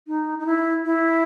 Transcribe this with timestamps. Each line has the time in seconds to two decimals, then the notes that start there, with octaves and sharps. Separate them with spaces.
0.07 D#4
0.39 D#4
0.46 E4
0.85 E4